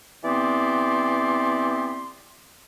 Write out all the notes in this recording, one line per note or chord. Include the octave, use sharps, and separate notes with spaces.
E3 B3 C4 G4 D5 C6